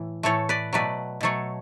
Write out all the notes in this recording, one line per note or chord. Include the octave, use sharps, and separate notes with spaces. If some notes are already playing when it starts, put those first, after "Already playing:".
Already playing: A2 E3
A2 E3 A3 A4 C#5
B4 D5
B2 F#3 A3 B4 D5
B2 F#3 A3 A4 C#5